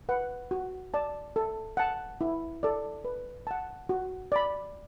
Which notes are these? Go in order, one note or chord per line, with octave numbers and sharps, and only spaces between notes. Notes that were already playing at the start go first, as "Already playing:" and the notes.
B4 F#5
F#4
D5 A5
A4
F#5 A5
E4
A4 D5
B4
F#5 A5
F#4
D5 B5